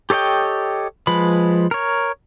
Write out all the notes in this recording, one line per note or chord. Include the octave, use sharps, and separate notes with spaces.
G4 A4 C#5 D#5 G5
F3 G#3 B4 B5
A#4 C#5